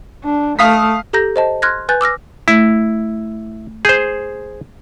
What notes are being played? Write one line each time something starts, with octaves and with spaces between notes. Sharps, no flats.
D4
A3 F5 D#6 B6
G4 A4 A#5 G6 A#6
C5 D#5 A5
C6 F6 F#6 G#6 A#6
B4 G#5 F#6 G6 A6
D6 E6 F6 A#6
A3 E4
G#4 C5 G6